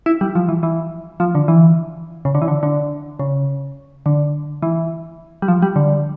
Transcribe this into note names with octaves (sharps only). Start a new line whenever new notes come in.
E4
G3
F3
E3
E3
F3
D3
E3
C#3
D3
E3
D3
D3
C#3
D3
E3
G3
F3
G3
D3